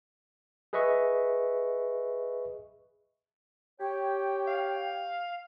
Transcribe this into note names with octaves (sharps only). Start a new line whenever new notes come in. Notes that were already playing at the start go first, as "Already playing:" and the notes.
G#4 B4 D#5 E5 C#6
G4 C#5 G5
F5